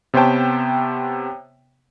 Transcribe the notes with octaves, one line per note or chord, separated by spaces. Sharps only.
C3 B3 C5 C#5 G5 A5